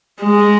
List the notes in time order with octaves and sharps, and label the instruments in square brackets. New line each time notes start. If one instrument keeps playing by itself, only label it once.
[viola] G#3